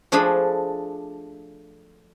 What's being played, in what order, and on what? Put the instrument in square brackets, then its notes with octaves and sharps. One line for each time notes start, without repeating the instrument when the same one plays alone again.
[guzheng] F3 A3 D4 G#4 B5